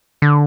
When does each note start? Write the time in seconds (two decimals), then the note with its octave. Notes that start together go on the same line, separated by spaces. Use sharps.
0.22 D3